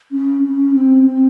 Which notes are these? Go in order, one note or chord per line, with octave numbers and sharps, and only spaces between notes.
C#4
C#4
C4
C4